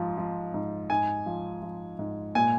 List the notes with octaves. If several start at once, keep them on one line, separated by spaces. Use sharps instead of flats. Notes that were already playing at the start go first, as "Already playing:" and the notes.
Already playing: G#2 F3
F3
G#2
G#2 G#5
F3
F3
G#2
A#2 G#5